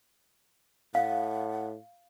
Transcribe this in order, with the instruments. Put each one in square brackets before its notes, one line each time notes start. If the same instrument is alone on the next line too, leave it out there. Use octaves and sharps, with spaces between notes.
[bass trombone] A2 [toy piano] F5 [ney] F#5